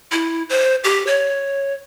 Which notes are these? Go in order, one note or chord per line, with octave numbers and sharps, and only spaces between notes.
E4
C5
G4
C#5